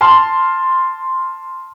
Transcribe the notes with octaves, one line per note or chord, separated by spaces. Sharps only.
A5 C6 F6